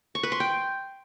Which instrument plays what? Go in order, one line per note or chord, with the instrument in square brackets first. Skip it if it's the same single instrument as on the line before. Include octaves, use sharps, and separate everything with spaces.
[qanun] C#6
B4
C6
G5